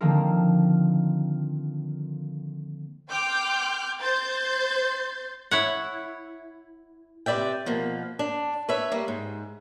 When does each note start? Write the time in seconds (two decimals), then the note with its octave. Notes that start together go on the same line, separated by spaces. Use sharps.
0.01 D3 D#3 F3 A#3 C4 A#4
3.10 G5 C6 D6 F6 G6
3.99 C5 C6 G6 A6
5.51 E4 C#5 F#5
7.26 C3 B4 D5 E5 G5
7.66 B2 F3 A#3
8.19 D4
8.69 B4 C#5 E5
8.92 G3 A#3
9.08 G#2